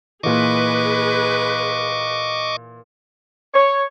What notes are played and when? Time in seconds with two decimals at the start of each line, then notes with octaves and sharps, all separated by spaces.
0.23 A#2 E3 G#4 B4 D#5 C#6 D6
3.54 C#5